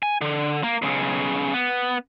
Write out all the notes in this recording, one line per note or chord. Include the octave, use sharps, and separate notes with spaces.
G#5
D3
A#3
B1 C#3
B3